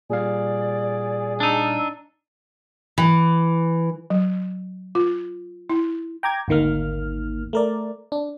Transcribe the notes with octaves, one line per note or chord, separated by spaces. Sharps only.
A#2 G3 G#4 D5 F5
D4 D#4 E6
E3
F#3
F4
E4
G5 A#5 D6 G#6
G#1 D2 D#3 A#3 F6
A3 A#4 D5
D4